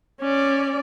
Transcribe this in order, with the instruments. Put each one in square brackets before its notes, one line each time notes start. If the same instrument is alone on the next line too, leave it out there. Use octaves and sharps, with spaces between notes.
[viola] C#4 D5